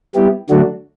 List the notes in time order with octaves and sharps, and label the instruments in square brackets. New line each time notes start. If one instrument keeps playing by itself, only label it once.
[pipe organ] G3 B3 E4 G4
D3 F#3 A3 D4 F#4